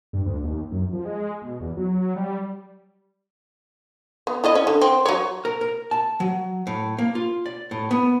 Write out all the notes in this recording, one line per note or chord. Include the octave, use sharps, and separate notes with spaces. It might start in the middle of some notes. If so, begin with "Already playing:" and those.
G2
D2
D#2
F#2
F3
G#3
B2
E2
F#3
G3
B3
E4 D5 D#5
C#4
D3
C4
F#3 C#5
A#4
A#4
A5
F#3
A2
A#3
F4
D5
A2
B3